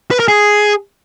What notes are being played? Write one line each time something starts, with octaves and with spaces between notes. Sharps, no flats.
B4
A#4
G#4